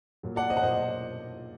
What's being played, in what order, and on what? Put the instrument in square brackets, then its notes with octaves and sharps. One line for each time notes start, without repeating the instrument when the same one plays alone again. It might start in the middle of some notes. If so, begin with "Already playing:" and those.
[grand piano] A#2 F#3
D5 F#5
C5 D#5
F#5
A#2 C5 D#5